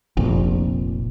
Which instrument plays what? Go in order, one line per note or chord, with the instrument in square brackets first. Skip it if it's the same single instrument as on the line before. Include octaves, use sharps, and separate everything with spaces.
[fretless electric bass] F1 A#1